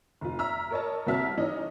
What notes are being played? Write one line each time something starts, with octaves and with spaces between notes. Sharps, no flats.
F1 F4
E5 A#5 E6 F6
A#4 C#5 D#5 A5
C2 C4 F#4 E5 A5 F6
E3 C#4 D#4 D#5